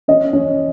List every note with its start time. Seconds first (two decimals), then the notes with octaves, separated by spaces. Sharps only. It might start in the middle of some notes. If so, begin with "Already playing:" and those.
0.08 C#4 D#5
0.33 C#4